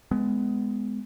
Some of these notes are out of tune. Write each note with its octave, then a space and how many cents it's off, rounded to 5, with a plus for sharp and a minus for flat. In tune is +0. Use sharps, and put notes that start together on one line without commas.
G#3 +10 B3 +20